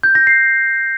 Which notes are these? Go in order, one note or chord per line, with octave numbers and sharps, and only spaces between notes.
G6
A#6
C7